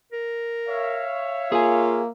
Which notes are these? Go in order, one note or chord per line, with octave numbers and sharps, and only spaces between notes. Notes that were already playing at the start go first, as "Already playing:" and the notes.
A#4
C#5 E5 F5
A#3 F4 G#4 G#5